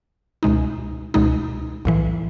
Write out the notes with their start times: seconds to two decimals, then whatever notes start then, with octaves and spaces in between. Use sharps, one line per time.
0.43 C#2 B2 G#3 D#4
1.14 C#2 B2 G#3 D#4
1.85 B1 A2 E3